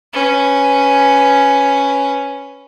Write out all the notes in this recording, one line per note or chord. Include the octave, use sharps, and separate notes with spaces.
C#4 B4